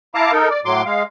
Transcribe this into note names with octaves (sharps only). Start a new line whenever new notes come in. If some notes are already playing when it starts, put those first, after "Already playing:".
E4 F5 A5 A#5 D6
D#4 A4 A#4
D5
A2 F#3 C6 D6
G#3 F5